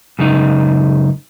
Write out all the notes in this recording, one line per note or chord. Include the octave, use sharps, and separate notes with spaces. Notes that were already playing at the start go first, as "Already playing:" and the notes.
F#2 C#3 G#3 D#4